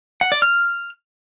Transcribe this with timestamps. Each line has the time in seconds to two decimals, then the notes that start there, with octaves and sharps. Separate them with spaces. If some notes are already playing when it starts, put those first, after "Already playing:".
0.21 F#5
0.32 D5
0.42 F6